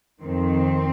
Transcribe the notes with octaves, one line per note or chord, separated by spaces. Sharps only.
F2 D#3 C4